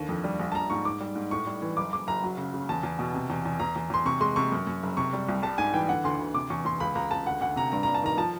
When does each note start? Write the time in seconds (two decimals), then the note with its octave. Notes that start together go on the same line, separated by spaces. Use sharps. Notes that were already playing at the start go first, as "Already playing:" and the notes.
Already playing: D#2 D3
0.09 F2
0.24 G3
0.40 A#1
0.52 A5
0.55 A#1 A#5
0.70 G#2 C#6
0.85 G#2 D6
1.00 G3
1.15 G#2
1.31 A2 C#6
1.47 G3
1.62 E3
1.77 F#1 D6
1.92 F#1 D6
2.07 F#1 A#5
2.23 F#3
2.38 C#3
2.54 C#3
2.69 E2 A5
2.83 E2
2.99 B2
3.14 C3
3.30 E2
3.46 E2
3.60 E2 A#5
3.76 E2
3.90 E2 C6
4.05 C3 C#6
4.21 G#3 C6
4.36 C3 C#6
4.52 F#2
4.67 F#2
4.83 F#1
4.97 C3 C#6
5.13 G3
5.29 C2
5.43 G3 A5
5.58 G#2 G#5
5.73 E3 G5
5.89 D3 F#5
6.04 D2 C6
6.19 D2
6.34 C3 D6
6.50 E2 C#6
6.65 E2 C6
6.80 C#2 B5
6.95 C#2 A#5
7.11 C#2 A5
7.26 D2 F#5
7.41 D2 F#5
7.56 C3 A#5
7.72 G2 A#5
7.83 G2 A#5
7.94 A5
8.03 D#3 A#5
8.17 F3 A5